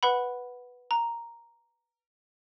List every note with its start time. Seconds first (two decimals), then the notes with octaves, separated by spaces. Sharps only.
0.03 B4 F#5 B5
0.91 A#5